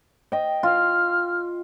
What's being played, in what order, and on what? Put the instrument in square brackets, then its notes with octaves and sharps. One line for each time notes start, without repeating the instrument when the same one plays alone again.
[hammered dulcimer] D#5 G5
[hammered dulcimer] F4 [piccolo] F6